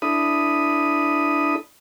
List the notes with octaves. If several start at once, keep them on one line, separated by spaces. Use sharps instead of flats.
D4 E4 A4 B5 D#6